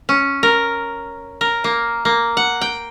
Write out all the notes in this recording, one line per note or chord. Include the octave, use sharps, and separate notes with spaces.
C#4
A#4
A#4
A#3
A#3
F#5
G5